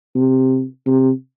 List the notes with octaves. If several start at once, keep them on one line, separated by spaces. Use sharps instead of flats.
C3
C3